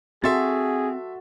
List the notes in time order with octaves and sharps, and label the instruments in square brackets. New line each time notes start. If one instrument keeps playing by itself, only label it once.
[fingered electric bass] C4 [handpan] F#4 A4 [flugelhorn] G#4 [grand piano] E5 C6 A6